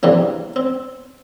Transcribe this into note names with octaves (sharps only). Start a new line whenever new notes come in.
E2 G2 C3 E3 A#3
C4